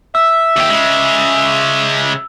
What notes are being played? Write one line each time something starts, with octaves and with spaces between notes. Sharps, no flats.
E5 E6
D#2 G4
C#3 G#3